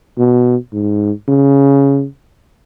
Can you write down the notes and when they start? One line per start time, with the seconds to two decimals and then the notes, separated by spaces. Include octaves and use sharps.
0.18 B2
0.73 G#2
1.29 C#3